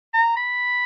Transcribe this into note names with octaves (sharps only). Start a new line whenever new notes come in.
A#5
B5